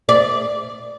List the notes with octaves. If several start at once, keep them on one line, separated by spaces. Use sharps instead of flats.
D5